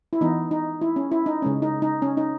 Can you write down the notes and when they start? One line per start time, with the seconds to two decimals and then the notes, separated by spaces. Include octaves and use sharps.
0.13 E4
0.21 E3 B3 D#4
0.51 D#4
0.81 E4
0.96 C#4
1.12 E4
1.26 D#4
1.42 C#3 G#3 C#4
1.62 D#4
1.82 D#4
2.02 C#4
2.17 D#4